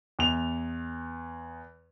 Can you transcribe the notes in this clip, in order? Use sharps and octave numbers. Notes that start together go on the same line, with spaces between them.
E2 F7